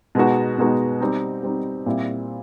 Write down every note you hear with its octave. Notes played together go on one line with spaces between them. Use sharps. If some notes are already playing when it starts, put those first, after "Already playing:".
B2 G#3 B3 D#4 F#4
B2 G#3 B3 D#4 F#4
G3 C4 D#4
G3 C4 D#4
A#2 G3 C4 E4